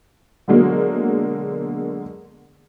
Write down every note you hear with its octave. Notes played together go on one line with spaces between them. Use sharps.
B2 D3 F#3 G#3 A#3